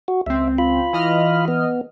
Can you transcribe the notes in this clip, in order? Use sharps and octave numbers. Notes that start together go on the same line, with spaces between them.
F#4
C#2 C4 E5
F4 B5
E3 D#5 F6
B3